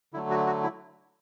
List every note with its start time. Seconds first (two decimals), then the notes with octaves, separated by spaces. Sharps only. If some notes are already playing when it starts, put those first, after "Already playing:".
0.14 D3 F#3 A3 E4
0.30 F#4
0.47 F#4
0.63 E4